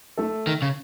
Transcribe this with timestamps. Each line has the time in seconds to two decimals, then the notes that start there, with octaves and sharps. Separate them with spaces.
0.18 A3 A4
0.47 D#3
0.62 C#3